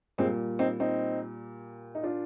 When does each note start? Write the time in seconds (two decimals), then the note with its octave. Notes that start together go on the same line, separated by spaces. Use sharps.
0.18 A#2 G3 G#3 C4
0.59 C4 D#4
0.80 C4 D#4
1.95 D#4
2.03 D4 F4